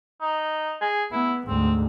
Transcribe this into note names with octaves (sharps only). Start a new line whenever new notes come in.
D#4
G#4
B3 E4
D2 G#2 C4